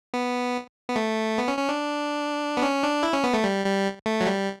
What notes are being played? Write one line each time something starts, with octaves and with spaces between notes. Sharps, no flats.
B3
B3
A3
B3
C#4
C#4
D4
B3
C#4
D4
E4
C#4
B3
A3
G3
G3
A3
F#3
G3